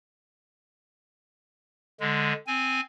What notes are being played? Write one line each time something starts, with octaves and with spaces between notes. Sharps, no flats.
D3 G#3
C4 G#5